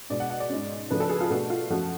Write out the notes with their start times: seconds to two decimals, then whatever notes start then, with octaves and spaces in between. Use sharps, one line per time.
0.10 B2 G#3 D4 D5
0.20 F#5
0.30 F#5
0.40 D5
0.50 G#2 G#3 C#4
0.91 C#3 F3 A3 D4 B4
1.00 A4
1.10 G#4
1.21 F4
1.30 B2 A3 D4 F#4
1.50 F4
1.70 F#2 F3 A3 F#4